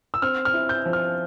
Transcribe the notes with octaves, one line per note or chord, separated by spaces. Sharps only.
E6
C4 F6
F6
E4
G6
F3
F6